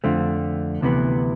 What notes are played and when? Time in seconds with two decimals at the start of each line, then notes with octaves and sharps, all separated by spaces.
0.04 F2 D3 A3 C4 F4
0.82 D2 C3 E3 B3